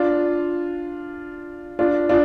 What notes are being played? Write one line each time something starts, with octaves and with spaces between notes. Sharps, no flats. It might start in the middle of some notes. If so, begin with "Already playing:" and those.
Already playing: D4 F4
D4 F4
D4 F4